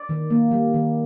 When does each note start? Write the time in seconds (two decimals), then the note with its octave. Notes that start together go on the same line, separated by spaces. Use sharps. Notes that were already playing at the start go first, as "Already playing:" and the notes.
Already playing: D5
0.09 D#3
0.30 A#3
0.51 G3
0.74 D#3